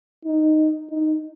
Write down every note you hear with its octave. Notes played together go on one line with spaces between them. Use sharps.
D#4
D#4